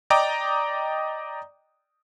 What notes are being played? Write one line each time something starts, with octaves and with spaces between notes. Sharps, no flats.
D5 D#5 G5 A#5 D6